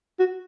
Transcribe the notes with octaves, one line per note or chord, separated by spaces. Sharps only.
F#4